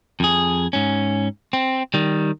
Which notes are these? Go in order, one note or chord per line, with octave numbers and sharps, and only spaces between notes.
F2 G#4
G#2 C#4
C4
D#3 G3